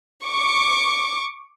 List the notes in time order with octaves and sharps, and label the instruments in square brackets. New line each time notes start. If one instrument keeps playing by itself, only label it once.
[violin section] C#6 D6